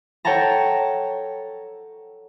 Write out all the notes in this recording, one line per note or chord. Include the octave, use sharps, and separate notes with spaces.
A4 C#5 F#5 G5 A5 A#5